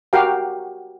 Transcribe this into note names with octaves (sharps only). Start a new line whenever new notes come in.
F#4 G4 A#4 F5 G5